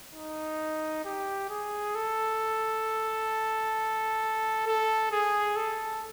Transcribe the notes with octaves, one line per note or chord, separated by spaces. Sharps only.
D#4
G4
G#4
A4
A4
G#4
A4